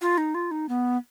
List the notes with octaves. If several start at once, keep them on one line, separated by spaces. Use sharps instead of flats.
F4
D#4
F4
D#4
B3